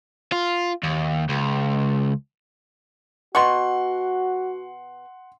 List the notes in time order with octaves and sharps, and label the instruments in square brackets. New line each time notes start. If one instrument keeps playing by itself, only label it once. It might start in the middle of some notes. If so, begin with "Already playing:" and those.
[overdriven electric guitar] F4
D#2
C#2
[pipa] B2 C#6 [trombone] F#4 [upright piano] F#5 C6